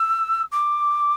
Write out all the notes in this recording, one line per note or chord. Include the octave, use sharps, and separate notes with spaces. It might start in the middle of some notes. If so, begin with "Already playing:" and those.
Already playing: E6
D6